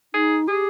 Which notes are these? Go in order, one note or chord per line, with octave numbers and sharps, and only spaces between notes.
D#4 G#4
G4 G#4